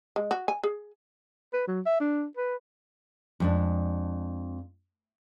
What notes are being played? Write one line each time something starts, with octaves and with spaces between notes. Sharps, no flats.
G#3
F#4
G#5
G#4
B4
F#3
E5
D4
B4
F2 G#3 D4